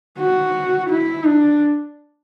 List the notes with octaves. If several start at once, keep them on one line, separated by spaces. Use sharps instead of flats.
F#4
E4
D4